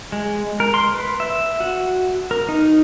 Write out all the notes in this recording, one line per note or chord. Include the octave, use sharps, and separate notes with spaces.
G#3
A#4
C6
B4
E5
F#4
A#4
D#4